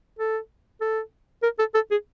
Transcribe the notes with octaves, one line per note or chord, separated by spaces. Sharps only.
A4
A4
A#4
A4
A4
G#4